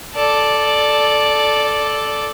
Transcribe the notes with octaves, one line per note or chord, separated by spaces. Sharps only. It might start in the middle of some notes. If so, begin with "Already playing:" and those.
A4 D5